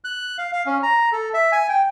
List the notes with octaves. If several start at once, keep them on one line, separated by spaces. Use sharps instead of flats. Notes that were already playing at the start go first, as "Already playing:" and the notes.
F#6
F5
F5
C#4
A#5
A4
E5
G#5
G5